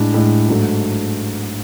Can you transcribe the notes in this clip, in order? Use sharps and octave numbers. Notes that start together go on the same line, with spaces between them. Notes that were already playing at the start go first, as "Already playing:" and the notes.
Already playing: A2 G#3 D4
A2 G#3 D4
G#2 F#3 A3 D4